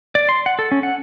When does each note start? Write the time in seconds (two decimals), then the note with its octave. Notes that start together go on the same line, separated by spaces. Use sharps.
0.15 D5
0.29 C6
0.46 F#5
0.59 A4
0.71 C#4
0.83 F#5